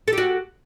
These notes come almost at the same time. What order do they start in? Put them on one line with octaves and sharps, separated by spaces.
A4 G4 F#4